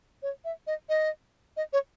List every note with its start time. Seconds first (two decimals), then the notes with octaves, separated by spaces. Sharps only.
0.23 C#5
0.45 E5
0.67 D#5
0.89 D#5
1.57 D#5
1.73 C#5